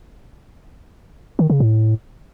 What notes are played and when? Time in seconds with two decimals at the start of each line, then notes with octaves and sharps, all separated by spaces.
1.39 D#3
1.50 C#3
1.60 A2